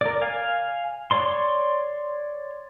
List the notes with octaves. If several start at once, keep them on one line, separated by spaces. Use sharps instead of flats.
A#4 D5
F5 G#5
C#5 D5 C6